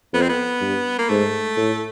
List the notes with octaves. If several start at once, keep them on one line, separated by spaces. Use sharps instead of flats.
F2 B3
C4
B3
G2
A#3
G#2 A3
A2